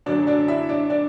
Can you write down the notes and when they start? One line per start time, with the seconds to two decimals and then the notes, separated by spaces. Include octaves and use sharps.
0.06 F#2 D3 F#3 A3 D4 D5
0.27 D4 D5
0.48 E4 E5
0.69 D4 D5
0.90 D4 D5